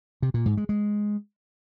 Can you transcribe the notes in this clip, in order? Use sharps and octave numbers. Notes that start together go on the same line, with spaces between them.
C3
A#2
G#2
G#3
G#3